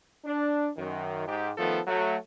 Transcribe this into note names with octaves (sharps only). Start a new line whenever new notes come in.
D4
F#2 D#3
G#2 G4
D#3 F3 A3 B3 A4
F#3 A3